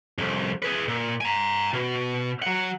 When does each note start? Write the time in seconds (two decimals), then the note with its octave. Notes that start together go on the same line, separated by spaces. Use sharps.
0.18 C2 F2
0.62 G#4 B4
0.88 A#2
1.21 G#5 A#5
1.73 B2
2.42 F#3 F#5